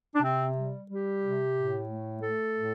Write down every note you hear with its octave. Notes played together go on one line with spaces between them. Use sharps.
D4
C3 C4
G3
G3 G4
C3
A2
A3
A3 A4
A2